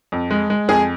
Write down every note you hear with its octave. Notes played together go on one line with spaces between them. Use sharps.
F2
G#3
G#3
F2 G#4